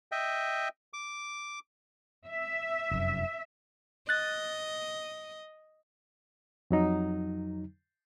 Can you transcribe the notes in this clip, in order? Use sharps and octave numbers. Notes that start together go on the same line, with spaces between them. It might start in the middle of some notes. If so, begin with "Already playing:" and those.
D#5 E5 G5
D6
E5
F1 F#2
D#5 F#6 A6
F2 F#3 D#4